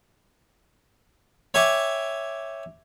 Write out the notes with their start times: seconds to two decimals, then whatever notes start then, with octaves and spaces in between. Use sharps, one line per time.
1.54 C#5 E5 G5 G#5 C#6 D6